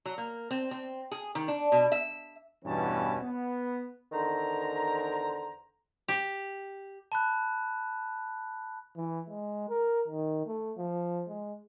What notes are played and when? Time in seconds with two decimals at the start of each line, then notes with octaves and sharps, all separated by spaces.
0.05 F#3
0.18 A#3
0.51 C4
0.71 C4
1.11 G#4
1.35 D#3
1.48 D4
1.72 B2
1.92 E5
2.65 E2 G2 B2 E3 C#4 A5
3.22 B3
4.12 E2 D3 D#3 C5 A#5
6.08 G4
7.12 A5 B5 F#6
8.96 E3
9.29 G#3
9.70 A#4
10.08 D#3
10.46 A3
10.78 F3
11.29 G#3